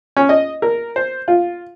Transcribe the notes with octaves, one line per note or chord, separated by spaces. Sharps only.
C#4
D#5
A#4
C5
F4